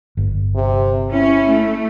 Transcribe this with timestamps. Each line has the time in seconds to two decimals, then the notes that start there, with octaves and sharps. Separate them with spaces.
0.17 G1
0.55 C3
1.13 C#4 E4
1.49 A3